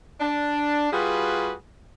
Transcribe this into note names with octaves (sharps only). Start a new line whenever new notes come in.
D4
G3 F4 F#4 G#4 B4